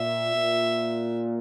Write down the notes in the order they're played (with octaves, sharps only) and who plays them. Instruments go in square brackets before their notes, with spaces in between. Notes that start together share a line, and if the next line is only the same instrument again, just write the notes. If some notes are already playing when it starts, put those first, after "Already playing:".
Already playing: [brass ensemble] A#2 [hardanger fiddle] E5
[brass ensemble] A#2